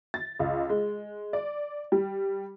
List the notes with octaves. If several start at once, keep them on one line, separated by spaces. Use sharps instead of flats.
A6
C#2
G#3
D5
G3